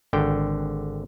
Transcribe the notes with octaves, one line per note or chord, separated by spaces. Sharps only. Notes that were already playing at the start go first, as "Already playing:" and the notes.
G#1 D3 G5